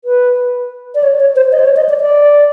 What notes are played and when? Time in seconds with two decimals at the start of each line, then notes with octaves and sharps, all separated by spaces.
0.05 B4
0.95 D5
1.03 C#5
1.19 C#5
1.36 C5
1.52 D#5
1.59 C5
1.65 C#5
1.76 D#5
1.89 D5
2.01 D5